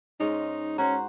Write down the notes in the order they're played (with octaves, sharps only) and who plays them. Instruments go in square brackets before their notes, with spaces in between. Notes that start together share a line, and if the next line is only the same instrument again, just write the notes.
[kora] G#2 G#3 C#4 [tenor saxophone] D#4
[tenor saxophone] C#4 [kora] F#4 C5 [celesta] A#5